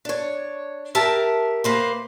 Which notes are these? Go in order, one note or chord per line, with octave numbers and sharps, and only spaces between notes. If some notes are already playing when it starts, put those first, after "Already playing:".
D4 C#5
G4 A#4 E5 A5
A#3 B4 C5